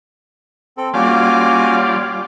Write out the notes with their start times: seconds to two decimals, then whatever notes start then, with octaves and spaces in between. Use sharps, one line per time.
0.77 C4 A4
0.94 G3 A#3 C#4 F4 F#4 D5 G#5